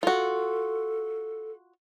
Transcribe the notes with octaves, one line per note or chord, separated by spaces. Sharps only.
F4 F#4 A4